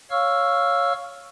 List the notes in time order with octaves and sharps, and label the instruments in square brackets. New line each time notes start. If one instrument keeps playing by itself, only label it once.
[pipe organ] C#5 F5 C#6 E6 F6